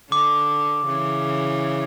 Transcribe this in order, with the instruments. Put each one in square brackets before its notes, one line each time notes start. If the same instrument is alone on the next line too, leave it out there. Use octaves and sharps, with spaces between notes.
[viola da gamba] D3 [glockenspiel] D6
[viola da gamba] C#3 E3